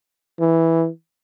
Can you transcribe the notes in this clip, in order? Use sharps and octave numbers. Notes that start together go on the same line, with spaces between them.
E3